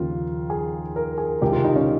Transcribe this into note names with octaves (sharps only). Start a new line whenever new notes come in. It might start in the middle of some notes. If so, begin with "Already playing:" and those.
Already playing: D#2 C#3 F3 F4
G#4
A#4
G#4
C#2 C3 D#3 G4
F4
D#4
C#4